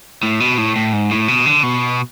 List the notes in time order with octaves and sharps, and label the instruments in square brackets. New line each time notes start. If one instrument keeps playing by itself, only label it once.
[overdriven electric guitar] A2
B2
A2
A2
G#2
A2
B2
D3
B2